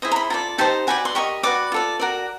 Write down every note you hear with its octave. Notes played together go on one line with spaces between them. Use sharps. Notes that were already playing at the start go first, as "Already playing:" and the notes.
E4 G#4 C5 D#5
A#5
B5
F4 A4 D5 A#5
D#4 G4 C5 A5
F#4 B4 D5 G#5
C6
G4 A#4 D#5 C#6
F#4 B4 D5 D6
F4 A4 D5
F#4 A#4 D5